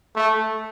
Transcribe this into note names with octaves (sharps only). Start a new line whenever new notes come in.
A3